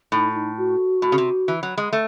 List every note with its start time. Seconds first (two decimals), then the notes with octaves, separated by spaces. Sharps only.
0.12 A2 D#4
0.31 E4
0.35 D#4
0.57 F#4
1.02 A2
1.12 C#3
1.18 C3
1.48 E3
1.63 F#3
1.78 G#3
1.93 A3